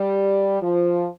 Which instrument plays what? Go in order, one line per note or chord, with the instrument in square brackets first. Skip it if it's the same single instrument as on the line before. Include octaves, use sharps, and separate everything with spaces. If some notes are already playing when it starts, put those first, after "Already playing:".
Already playing: [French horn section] G3
F3